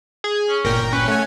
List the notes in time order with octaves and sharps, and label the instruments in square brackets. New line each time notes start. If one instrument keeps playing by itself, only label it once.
[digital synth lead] G#4
[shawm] C#4
[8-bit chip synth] G1 A#2 G5 [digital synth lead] A#4
[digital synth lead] C#4 [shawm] B4
[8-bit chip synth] A3 G#5 [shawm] F#5